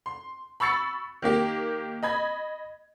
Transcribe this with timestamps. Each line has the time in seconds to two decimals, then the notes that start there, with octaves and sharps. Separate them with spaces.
0.06 C6
0.60 B5 C#6 E6 A6 C#7
1.22 D#3 A#3 G4
2.03 D#5 B5 G#6